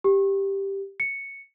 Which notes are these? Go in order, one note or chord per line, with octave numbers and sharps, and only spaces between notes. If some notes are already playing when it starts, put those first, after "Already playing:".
G4
C#7